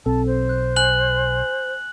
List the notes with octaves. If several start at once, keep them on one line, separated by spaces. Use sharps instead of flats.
B1 C4 A4 A5
C5
F#6
G#5 F#6 F#7